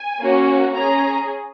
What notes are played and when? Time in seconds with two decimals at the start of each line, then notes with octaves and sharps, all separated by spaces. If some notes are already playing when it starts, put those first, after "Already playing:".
Already playing: G#5
0.21 A#3 C#4 F#4
0.74 C#4 G#4 A#5